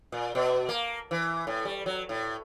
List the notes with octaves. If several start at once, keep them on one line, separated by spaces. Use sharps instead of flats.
A#2
B2
A#3
E3
A2
G3
F#3
A2